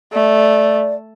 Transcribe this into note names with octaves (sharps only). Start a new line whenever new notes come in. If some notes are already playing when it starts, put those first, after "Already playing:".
A3 D5